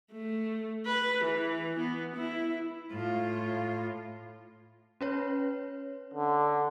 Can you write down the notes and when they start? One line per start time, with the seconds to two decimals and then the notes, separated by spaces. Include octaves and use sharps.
0.12 A3
0.86 B4
1.25 E3
1.79 B3
2.16 E4
2.92 A2 F4
5.01 C#4 B4 C#5
6.14 D3